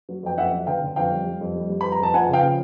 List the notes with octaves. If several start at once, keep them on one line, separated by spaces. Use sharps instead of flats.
F#3
F2 G5
F2 E5 F#5
F#3
D3 F5 G5
D3
F2 F5 G5
G3
G3
F2
G3
G3
F2 B5
A#5
F2 A5
F3 F#5 G#5
C#3 F5 G5
F3